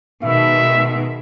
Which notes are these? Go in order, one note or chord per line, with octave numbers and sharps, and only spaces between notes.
B2 D#3 G#3 E5